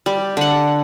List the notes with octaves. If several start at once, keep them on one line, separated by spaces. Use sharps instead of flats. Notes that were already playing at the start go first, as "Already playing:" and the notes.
G3
D3 F#5